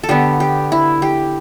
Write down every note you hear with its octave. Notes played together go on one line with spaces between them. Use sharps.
A4
D3 B3 G4
G4
E4
G4